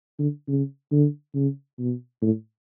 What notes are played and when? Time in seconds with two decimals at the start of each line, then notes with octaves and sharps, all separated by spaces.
0.19 D3
0.48 C#3
0.92 D3
1.35 C#3
1.79 B2
2.22 A2